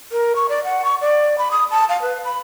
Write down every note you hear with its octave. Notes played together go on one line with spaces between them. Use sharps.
A#4
C#6
D5
F#5
C#6
D5
B5
D#6
A5
F5
B4
B5